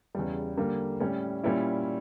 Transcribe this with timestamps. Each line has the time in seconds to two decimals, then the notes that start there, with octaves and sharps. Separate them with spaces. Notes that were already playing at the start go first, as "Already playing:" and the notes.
0.15 E2 C#3 G3
0.57 D3 G3 A#3
1.00 A2 G3 C#4
1.43 A#2 G3 C#4 E4